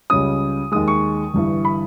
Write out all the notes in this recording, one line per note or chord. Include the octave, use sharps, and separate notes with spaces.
C#2 C#3 G3 C#4 D#6
D#2 D#3 G#3 D#6
C#6
G1 G2 E3
B5